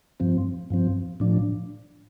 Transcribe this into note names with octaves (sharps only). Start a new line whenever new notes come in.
G2 F3 C4
G2 F3 C4
A2 F3 D4